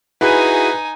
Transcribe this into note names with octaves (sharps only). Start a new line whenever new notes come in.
D#4 E4 F#4 G#4 B4 G#5